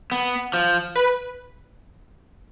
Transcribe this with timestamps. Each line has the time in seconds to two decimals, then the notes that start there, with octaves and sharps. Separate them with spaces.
0.12 B3
0.54 F3
0.96 B4